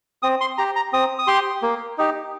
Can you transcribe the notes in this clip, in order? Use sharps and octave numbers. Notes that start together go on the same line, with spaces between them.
C4 D#6
C6
G4 A#5
A#5
C4 D#6
D#6
G4 C6
A#3
D#4 G4